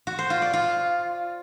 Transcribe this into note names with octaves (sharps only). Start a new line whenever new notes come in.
F#4
C5
F4
D5
F4